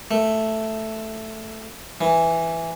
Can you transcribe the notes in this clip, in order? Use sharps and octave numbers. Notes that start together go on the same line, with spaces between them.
A3
E3